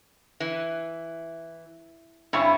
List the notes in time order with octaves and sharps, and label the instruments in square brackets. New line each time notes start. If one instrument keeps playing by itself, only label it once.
[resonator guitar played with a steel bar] E3
[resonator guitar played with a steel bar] G2 C4 C#4 [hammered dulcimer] E4 B5 C#6